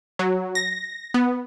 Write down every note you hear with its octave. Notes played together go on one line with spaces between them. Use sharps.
F#3
A#6
B3